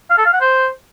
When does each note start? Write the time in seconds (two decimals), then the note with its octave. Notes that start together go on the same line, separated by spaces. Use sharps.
0.10 F5
0.18 A4
0.26 F5
0.33 F#5
0.41 C5